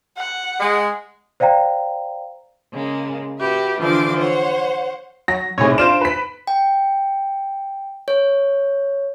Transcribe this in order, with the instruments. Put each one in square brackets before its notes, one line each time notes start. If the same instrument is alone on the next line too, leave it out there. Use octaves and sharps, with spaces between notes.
[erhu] F#5
[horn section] G#3
[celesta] C5 D5 F5 G5 A#5
[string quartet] C#3 G#3 A#3
F#4 G4 B4 E5
D3 E3 F3 D4 C6 D6
C5 C#5 F#5
[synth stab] F#3 [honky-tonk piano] A#6
[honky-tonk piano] B1 A2 C3 [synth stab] G#4 C#5
[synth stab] D4 F4 C5 [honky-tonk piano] D7 E7
[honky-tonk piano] B4 B6
[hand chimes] G5
C#5